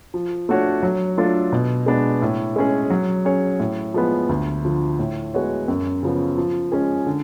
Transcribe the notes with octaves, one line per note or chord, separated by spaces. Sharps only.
F3
A3 D4 F#4 C#5
F#3
A3 D4 F4 A4
B2
G#3 B3 D4
A2
G#3 C#4 G#4
F#3
C#4 G#4 C#5
A2
F3 G#3 B3
D2
D3 F3
A2
G#3 B3 F#4 C#5
F#2
C#3 F3 B3
F3
G#3 C#4 G#4
D3